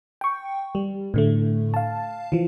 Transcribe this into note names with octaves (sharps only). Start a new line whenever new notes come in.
G5 C#6
G3
A2 D3 A3
F5 A5
E3 F3